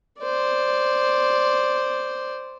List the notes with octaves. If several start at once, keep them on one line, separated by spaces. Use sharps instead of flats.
C5 D5